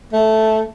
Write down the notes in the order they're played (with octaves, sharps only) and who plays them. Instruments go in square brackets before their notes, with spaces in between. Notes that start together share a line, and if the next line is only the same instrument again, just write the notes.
[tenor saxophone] A3